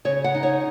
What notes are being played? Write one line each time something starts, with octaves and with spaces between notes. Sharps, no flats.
C#3 C#5
F#5
D#4
C#5